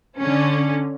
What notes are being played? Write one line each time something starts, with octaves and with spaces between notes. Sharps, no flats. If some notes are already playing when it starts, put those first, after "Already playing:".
D3 C#4